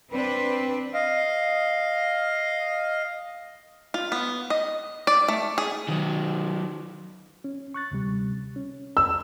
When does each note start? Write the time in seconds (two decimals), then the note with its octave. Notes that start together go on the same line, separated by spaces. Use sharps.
0.13 C4 D4 B4
0.94 D#5 F5
3.94 F4
4.12 B3
4.50 D#5
5.07 D5
5.28 A3
5.58 G#4
5.88 D#3 F#3
7.44 C#4
7.74 C#6 F#6 A6
7.92 D2 C3 G3
8.56 C#4
8.97 E6